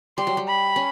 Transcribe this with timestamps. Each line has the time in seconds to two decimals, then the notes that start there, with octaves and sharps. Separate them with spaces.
0.18 G3 C6
0.27 F#3
0.37 G3
0.47 B5
0.76 C#4